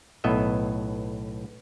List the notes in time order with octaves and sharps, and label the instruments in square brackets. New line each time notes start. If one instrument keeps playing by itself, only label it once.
[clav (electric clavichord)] B1 A2 B3 D#5 E5